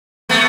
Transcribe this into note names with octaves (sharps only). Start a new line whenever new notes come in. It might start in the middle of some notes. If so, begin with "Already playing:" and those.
A3 B3